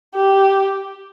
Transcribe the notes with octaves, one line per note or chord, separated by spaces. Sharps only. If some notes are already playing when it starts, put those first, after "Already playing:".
G4